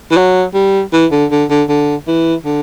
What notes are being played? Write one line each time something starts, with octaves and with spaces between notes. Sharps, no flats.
E3
F#3
G3
E3
D3
D3
D3
D3
E3
D3